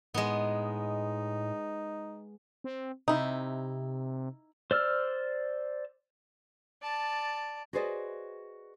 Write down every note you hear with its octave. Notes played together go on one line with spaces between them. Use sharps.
A2 G#3 B3 D#4
C4
C3 D#4 E4
C5 D5 E6 F6
D5 A5
F#4 G#4 B4 C5 D5 D#5